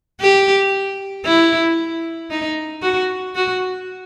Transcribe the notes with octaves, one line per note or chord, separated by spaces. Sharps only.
G4
E4
D#4
F#4
F#4